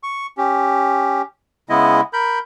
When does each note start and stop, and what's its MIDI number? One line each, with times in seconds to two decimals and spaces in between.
0.03 0.26 85
0.38 1.22 61
0.38 1.22 67
1.69 2.01 49
1.69 2.01 56
1.69 2.01 59
1.69 2.01 64
1.69 2.01 75
2.13 2.39 70
2.13 2.39 83
2.13 2.39 91